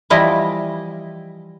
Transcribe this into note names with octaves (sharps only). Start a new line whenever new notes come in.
E3 F3 G3 E4 D#5